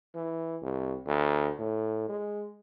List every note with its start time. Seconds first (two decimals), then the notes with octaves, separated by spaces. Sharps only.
0.15 E3
0.62 C2
1.06 D2
1.59 A2
2.09 G#3